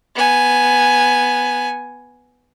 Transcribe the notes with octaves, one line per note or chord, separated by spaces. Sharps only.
B3 G#5